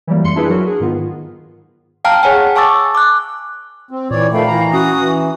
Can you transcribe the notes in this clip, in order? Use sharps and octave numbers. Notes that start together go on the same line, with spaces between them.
E3 F#3 G3 A#3
F#2 G#3 C6 C#7
D4 E4 F4 G#4 B4
F#3 F#4 A#4
G#4
G#2 D#3 B3 F4
F5 G5 A5 A#5 F6
G#4 C#5 F#5 G#5
G#5 A5 C#6 D6 E6 A6
D6 F#6
C4
A#2 E3 C#5 D5
D#3 F3 A3 F5 G5 B5
E3 A#5
C#4 F#4 D#6
E3